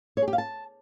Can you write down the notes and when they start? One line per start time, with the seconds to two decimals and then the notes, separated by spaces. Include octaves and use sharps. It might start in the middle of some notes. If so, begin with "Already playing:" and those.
0.17 C#5
0.22 G#4
0.28 G4
0.33 F5
0.38 A5